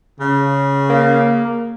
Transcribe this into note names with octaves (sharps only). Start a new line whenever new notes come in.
C#3
A#3